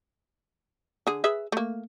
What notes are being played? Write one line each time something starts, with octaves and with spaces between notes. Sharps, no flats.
D3 G#4
G#4 B4 E5
A3 A#3